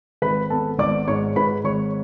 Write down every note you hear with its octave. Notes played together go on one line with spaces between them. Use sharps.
G#1 B4 B5
B3 A4 A5
G#1 D5 D6
G#2 C#5 C#6
G#2 B4 B5
G#1 C#5 C#6